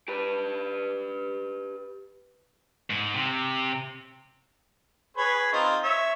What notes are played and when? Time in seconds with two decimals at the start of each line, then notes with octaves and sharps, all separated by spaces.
0.08 G4 B4
2.90 G#2
3.14 C3
5.17 G#4 B4 C#5
5.53 C4 D#4 F4
5.83 C#5 E5